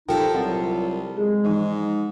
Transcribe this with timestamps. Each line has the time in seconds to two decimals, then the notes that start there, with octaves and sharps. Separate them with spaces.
0.09 A#2 F3 D#4 F4 G4 A4 A#4 G5
0.34 C2 F#3 F4 F#5
1.17 G#3 G#4
1.44 G#2 E3 F3 D#4